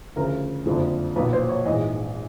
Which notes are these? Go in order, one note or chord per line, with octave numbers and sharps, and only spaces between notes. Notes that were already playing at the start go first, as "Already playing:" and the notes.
D2 C#3 F3 A#4
F#1 F2 D3 F3
B1 A#2 F3 B4
C5
C#5
A#1 G#2 E3 D#5